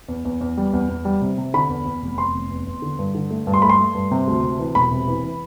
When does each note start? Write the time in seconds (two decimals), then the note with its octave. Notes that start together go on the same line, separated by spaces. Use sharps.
0.08 E2
0.25 E2
0.41 E2
0.57 G3
0.73 E2
0.89 E2
1.05 G3
1.22 C3
1.38 C3
1.54 D3 B5
1.69 E2
1.86 E2
2.02 F1
2.18 E2 C6
2.34 F1
2.50 E2
2.67 E2
2.82 D3
2.99 G2
3.15 D3
3.31 A3
3.47 G2
3.54 C6
3.62 A3 B5
3.69 C6
3.79 A3
3.95 G2
4.11 C3
4.27 D2
4.43 C3
4.59 E3
4.75 E1 B5
4.91 C3
5.08 E3
5.24 E3